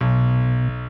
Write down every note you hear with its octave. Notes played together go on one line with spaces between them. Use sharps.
B1 B2